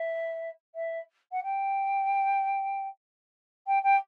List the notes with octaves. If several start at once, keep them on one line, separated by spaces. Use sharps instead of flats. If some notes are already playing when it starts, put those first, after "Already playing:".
Already playing: E5
E5
F#5
G5
G5
G5